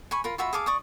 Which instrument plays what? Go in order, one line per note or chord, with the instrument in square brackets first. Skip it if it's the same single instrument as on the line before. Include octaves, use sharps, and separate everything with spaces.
[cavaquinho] G#5 B5 C#6
F4 A#4 B5
F4 F#4 E5 B5
G#4 A4 F5 D6
D5 C#6 D#6